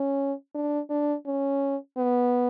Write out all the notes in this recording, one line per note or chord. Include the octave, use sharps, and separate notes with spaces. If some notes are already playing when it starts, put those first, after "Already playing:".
Already playing: C#4
D4
D4
C#4
B3